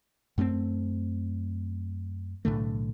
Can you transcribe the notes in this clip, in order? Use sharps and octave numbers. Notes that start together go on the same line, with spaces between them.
F#2 A3 A#3 C4
B1 A2 D3 A3